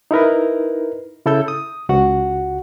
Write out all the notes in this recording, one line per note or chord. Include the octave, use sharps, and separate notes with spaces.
D#4 E4 A#4 B4
C#3 E4 A4 E6 G6
D#6
C#2 F#4 F#5